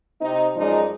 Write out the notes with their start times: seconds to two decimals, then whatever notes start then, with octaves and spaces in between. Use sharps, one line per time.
0.20 C3 C4 D#4
0.56 F#2 F3 G#3 D#4 D5